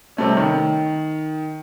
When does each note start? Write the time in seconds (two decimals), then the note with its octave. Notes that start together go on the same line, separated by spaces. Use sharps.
0.17 C3 G3 A3 C#4
0.37 D#3